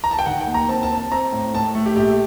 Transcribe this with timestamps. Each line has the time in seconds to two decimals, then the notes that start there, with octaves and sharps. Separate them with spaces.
0.04 A#5
0.11 A5
0.19 G5
0.26 D#3 F#5
0.41 G5
0.47 D#2
0.54 A#5
0.69 C4 A5
0.83 A5
0.90 C4
0.98 A5
1.12 C4 A#5
1.32 A2
1.54 A2 A5
1.75 A3
1.86 G4
1.96 A#1 G4